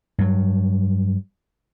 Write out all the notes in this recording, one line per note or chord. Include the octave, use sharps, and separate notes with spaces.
G2 F#3